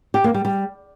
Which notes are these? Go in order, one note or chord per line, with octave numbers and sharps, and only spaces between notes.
G4
A#3
G3
G3